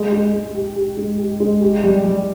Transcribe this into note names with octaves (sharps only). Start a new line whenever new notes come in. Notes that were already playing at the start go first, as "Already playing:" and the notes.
Already playing: G#3
G#3
G#3
G4
G4
G#3
G4
G#3
G4
G3
G3